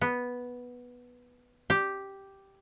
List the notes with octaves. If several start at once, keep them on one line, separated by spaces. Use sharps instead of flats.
B3
G4